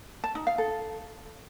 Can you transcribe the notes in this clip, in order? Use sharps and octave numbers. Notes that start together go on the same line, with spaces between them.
A5
D#4
F5
A4